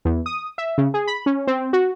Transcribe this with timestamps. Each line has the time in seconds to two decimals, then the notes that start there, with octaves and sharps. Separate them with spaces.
0.05 E2
0.26 D#6
0.58 E5
0.78 C#3
0.94 G#4
1.07 B5
1.26 C#4
1.47 C4
1.73 F#4